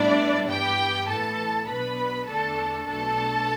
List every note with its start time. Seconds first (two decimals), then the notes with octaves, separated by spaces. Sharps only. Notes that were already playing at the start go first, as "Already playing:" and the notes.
Already playing: A2 G3 B3 D4 E4 D5
0.49 G2 E3 B3 G4 G5
1.08 A2 E3 B3 A4 A5
1.68 B1 B2 B3 D4 B4 B5
2.27 E2 D3 A3 D4 A4 A5
2.87 B1 B2 A3 D4 A4 A5